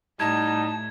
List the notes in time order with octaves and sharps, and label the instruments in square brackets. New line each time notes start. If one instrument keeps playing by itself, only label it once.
[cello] A2 [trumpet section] G3 D#4 [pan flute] A5 [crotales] G#6